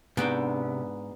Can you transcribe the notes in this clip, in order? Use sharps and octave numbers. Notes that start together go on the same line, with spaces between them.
G#2 C3 B3 D4 F#4 G5